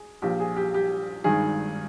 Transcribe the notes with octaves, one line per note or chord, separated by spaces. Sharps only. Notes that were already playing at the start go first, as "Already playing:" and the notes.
Already playing: G#4
A#1 A#2 F3 G4
G#4
G4
G4
G#1 G2 D#3 G#4